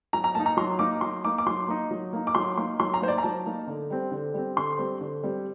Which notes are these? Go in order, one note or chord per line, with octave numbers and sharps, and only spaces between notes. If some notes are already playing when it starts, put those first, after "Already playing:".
F#3 A#5
A#5
A#3 D#4 A5
A#5
F#3 C6
A#3 D#4 D6
F#3 C6
A#3 D#4 D6
D6
F#3 C6
A#3 D#4
F#3
A#3 D#4
D6
F#3 C6
A#3 D#4 C6
F#3 C6
A#5
A#3 D#4 C5
D5
A#5
F#3 A5
A#3 D#4
D3
G3 C4
D3
G3 C4
D3 C6
G3 C4
D3
G3 C4